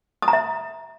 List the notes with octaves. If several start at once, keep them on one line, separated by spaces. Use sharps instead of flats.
D#6
A#5
E5